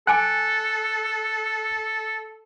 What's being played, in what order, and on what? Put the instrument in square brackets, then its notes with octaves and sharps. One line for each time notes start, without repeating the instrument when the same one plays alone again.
[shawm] A4 [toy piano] G5 G#5 D6 [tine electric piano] F#6